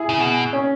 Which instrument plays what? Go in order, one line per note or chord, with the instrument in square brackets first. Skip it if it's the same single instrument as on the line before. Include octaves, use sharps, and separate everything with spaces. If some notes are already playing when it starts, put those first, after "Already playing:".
Already playing: [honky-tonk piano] E4 G#4
[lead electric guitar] C#3
B2
[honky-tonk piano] C#4